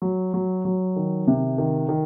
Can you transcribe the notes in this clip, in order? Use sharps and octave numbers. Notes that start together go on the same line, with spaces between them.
F#3
F#3
F#3
D#3
C3
D#3
D#3